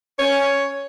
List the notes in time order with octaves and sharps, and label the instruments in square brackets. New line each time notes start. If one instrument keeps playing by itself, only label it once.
[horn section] C#4 [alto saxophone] C#5